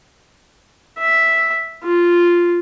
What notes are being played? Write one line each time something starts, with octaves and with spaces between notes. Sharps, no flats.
E5
F4